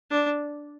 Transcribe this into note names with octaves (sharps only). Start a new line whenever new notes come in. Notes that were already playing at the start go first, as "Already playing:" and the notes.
D4